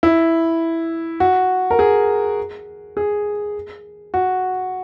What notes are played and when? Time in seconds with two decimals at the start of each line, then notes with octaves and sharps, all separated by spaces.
0.03 E4
1.20 F#4
1.71 A#4
1.79 G#4
2.97 G#4
4.14 F#4